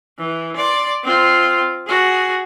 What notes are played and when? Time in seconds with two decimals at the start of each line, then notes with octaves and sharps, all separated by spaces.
0.19 E3
0.57 D5 C6
1.04 C4 F4
1.87 F#4 G#4